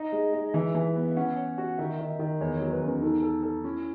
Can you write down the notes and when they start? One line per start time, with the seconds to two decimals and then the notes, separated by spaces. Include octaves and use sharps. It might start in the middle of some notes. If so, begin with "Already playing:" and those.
Already playing: D#4 D#5
0.12 G#3
0.33 G#3
0.47 D#5
0.54 E3 E5
0.75 E3
0.96 B3
1.10 E5
1.17 C#4 F#5
1.36 C#5
1.58 F#4
1.78 D#3 E5
1.99 D#3
2.19 D#3
2.41 E2 C#5
2.55 C#5
2.61 F#3
2.72 B4
2.81 E2
2.86 C#4
3.02 D#4 A4
3.23 A4
3.43 A4
3.64 C#4 E4